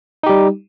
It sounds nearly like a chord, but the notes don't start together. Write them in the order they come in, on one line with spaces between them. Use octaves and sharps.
D#4 G4 G3